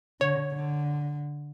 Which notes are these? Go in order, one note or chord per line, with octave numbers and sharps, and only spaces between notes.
D3 C#5
D3